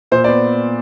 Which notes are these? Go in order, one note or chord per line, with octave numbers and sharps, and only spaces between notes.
A#2 C5
D5
B3